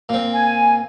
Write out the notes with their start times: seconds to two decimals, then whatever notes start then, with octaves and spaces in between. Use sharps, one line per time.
0.09 A#2 C4
0.33 G#5